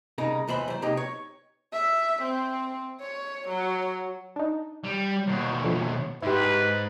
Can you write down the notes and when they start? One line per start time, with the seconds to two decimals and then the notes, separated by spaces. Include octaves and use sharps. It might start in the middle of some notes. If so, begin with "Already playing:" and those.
0.18 C2 C#3 D#4 A#4 A#5
0.48 D#2 E3 C5 B5
0.68 F#3 C5
0.82 C3 A#3 D#4 G4
0.97 C#5
1.73 E5
2.22 C4
3.01 C#5
3.48 F#3
4.36 D4 D#4
4.84 G3
5.27 D#2 B2
5.64 D3 F3
6.22 G#2 E4 G4 B4